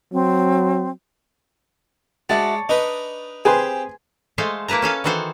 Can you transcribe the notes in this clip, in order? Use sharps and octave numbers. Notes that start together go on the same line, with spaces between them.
F#3 C4
G#3 F#4 C#5 D5 E5 A5
D4 D#4 B4 D#5
C4 G4 G#4 B4 G#5 C6
G#3 A3 A4 C5 D#5 F5
A#3 E4 B4 A5 A#5
C#4 A4 F5 G#5
D#3 E3 F#4 A4 C5